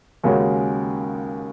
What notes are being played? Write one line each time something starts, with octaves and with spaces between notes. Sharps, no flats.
D#2 C#3 G#3 C#4 F#4